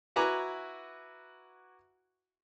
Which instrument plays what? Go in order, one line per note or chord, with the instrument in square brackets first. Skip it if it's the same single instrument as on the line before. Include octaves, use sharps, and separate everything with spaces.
[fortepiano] E4 F#4 B4 G#5 A#5 D6